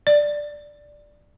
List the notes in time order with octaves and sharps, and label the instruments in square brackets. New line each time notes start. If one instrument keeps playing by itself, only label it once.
[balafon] D5